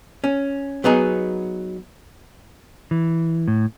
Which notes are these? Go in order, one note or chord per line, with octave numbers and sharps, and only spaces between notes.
C#4
F#3 B3 D#4 G#4
E3
A2